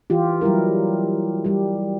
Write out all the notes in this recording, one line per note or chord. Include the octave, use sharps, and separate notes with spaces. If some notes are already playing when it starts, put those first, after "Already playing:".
E3 F4 G4
F#3 G3 E4 A#4
G3 G4